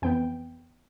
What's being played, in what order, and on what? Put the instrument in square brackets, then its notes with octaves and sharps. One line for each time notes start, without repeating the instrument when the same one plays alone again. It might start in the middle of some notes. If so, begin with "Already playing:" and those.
[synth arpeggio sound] F2 E3 B3 G5